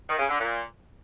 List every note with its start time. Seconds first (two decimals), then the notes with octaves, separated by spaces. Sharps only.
0.09 D#3
0.19 C#3
0.28 D3
0.38 A#2